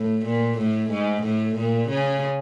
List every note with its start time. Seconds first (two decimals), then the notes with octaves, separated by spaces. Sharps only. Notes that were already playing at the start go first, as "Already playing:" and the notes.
Already playing: A2
0.25 A#2
0.58 A2
0.91 G#2
1.23 A2
1.55 A#2
1.89 C#3